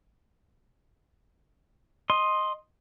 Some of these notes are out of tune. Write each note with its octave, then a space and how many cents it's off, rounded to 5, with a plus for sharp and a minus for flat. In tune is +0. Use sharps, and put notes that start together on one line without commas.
D#5 +0 C6 +10